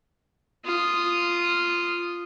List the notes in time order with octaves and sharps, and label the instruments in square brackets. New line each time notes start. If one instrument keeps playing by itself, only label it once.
[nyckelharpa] F4 D#6